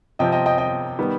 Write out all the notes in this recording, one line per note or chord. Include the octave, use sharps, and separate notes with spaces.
C3 F3 C4 D#5 G5
D#5 G5
D#5 G5
D#5 G5
D#3 G3 B3